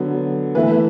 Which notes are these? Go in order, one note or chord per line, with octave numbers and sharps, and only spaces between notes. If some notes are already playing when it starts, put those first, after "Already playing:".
Already playing: D3 F#3 B3
E3 A3 E4 B4